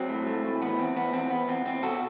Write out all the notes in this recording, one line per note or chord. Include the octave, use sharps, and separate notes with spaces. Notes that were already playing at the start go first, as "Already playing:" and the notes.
Already playing: F#3 C4
A2
A3
A2
E2 B3
E2 C4
E2 B3
E2 C4
E2 B3
E2 C4
E2 C4
B2 F#4 A4